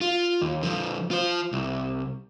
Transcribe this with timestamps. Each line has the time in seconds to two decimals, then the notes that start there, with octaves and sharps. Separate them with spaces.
0.01 F4
0.41 D#2
0.63 D3 F3
1.11 F4 C5
1.53 C2